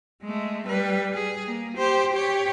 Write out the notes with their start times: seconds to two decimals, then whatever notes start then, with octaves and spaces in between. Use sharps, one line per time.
0.23 G#3 A3
0.67 G3 B4
1.13 G#4
1.47 A#3
1.78 G4 C5
2.13 G4 C#5